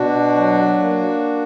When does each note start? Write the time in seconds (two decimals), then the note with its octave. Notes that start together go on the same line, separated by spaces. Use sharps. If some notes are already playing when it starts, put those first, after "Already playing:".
Already playing: B2 D4 F#4
0.35 F#3
0.78 A#3